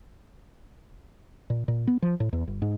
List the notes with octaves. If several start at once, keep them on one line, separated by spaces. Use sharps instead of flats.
A#2
A#2
B3
F3
A2
E2
G1
G#2